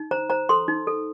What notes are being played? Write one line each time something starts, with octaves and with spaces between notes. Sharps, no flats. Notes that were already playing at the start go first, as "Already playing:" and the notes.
Already playing: D#4
C5 A#5
C5 A#5
A4 C6
D#4
A4